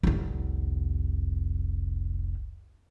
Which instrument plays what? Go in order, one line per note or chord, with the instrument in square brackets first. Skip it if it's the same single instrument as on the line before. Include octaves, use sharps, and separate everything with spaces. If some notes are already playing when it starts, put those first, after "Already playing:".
[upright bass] F1 C2